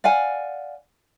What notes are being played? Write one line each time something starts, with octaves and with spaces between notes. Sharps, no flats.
D5 F5 F#5 G#5